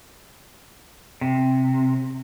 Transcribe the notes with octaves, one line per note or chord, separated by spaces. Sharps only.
C3